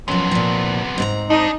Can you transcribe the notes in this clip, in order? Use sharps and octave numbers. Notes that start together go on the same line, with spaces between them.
F#2 C3 F3 B3
A#2 F3
G#2 C4 A#5
D4 D#4